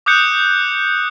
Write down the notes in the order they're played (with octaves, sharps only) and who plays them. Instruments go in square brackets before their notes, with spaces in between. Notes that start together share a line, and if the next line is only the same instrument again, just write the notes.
[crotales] D6 D#6 F#6 G6 C#7